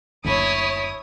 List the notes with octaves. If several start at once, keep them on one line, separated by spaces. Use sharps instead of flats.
F#1 D2 E4 C#5 A5 D#6